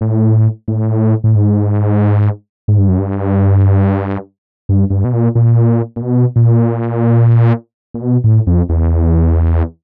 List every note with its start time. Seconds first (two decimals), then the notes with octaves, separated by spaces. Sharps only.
0.01 A2
0.68 A2
1.24 A2
1.35 G#2
2.68 G#2
2.78 G2
2.88 F#2
2.99 G2
4.69 G2
4.90 G2
5.04 B2
5.13 A#2
5.35 A#2
5.96 A#2
6.02 B2
6.36 A#2
7.94 A#2
8.02 B2
8.24 A2
8.47 F2
8.69 E2